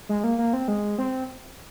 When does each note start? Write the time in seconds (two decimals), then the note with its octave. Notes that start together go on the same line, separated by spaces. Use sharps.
0.09 G#3
0.24 A#3
0.38 A#3
0.53 C4
0.68 G#3
0.98 C4